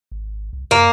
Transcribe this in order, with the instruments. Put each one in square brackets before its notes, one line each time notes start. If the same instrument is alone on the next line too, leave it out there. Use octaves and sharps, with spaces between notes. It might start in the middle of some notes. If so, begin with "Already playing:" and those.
[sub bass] G#1
C2
[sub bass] F#2 [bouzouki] A#3